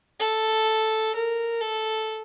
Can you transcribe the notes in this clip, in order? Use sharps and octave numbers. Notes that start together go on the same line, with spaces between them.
A4
A#4
A4